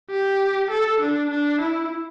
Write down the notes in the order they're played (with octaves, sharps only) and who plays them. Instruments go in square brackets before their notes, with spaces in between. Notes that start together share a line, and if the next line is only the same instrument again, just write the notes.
[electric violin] G4
A4
D4
D4
E4